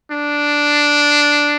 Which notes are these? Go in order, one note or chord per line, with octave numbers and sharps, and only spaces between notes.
D4